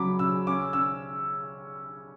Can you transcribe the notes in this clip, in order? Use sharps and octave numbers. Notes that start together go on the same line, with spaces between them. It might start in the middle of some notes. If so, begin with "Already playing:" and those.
Already playing: C#3 F#3 B5 D6
C#3 E6
C#4 D6
C#4 E6